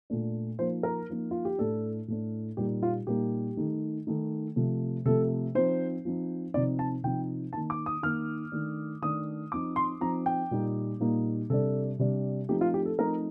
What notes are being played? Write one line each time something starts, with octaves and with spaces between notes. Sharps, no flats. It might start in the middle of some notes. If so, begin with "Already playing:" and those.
A#2 A3 D4
F3 A#3 D#4 C5
A#4
F3 A#3 D#4
F4
G4
A2 A3 D4 A4
A2 A3 D4
A#2 G3 A#3 D#4 G4
F4
A#2 G3 A#3 D#4 G4
D#3 A3 D#4
D#3 A3 D#4
C3 F3 A3
C3 F3 A3 A4
F3 C4 D#4 C5
F3 C4 D#4
C3 F3 C4 D#4 D5
A5
C3 F3 C4 D#4 G5
D#3 A#3 D#4 A5
D6
D#6
D#3 A#3 D#4 F6
D#3 A3 D4
D#3 A3 D4 D#6
F3 C4 D#4 D6
C6
F3 C4 D#4 A#5
G5
A#2 G3 A#3 D#4
A#2 G3 A#3 D#4
C3 G3 D4 A4
C3 G3 D4
F3 A3 C4 D#4 G4
F4
G4
A4
F3 A3 C4 D#4 A#4